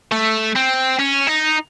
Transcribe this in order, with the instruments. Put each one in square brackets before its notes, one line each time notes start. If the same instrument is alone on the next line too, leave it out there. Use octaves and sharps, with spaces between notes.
[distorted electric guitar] A3
C4
C#4
D#4